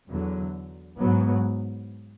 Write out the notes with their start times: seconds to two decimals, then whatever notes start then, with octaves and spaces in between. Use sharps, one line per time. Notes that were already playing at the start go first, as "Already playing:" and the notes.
0.09 E2 D3 F#3
0.99 G#2 F#3 B3